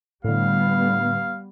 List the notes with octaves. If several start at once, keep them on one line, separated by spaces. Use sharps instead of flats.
A2 D3 G3 B3 F5